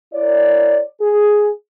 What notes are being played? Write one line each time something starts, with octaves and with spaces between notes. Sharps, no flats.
E4 A#4 C#5 D5
G#4